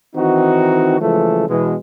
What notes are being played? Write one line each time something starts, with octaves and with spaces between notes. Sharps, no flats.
D#3 E3 C4 D#4 F#4
C#3 E3 F3 G#3 A3 A4
B2 E3 G#3